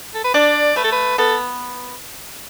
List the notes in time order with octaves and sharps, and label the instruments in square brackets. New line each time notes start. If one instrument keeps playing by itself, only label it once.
[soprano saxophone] A4
B4
[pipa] D4 [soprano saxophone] D5
[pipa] A3 [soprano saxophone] B4
[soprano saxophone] A4
B4
[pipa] B3 [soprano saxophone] A4